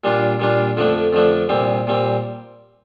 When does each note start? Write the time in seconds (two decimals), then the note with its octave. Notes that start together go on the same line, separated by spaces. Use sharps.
0.04 A#2 G3 D4 F4
0.40 A#2 G3 D4 F4
0.77 F2 D3 F3 A3 D4
1.13 F2 D3 F3 A3 D4
1.49 C2 A#2 G3 C4
1.87 A#2 G3 C4